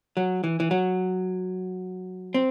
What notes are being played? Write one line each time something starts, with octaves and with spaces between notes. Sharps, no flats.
F#3
E3
E3
F#3
C4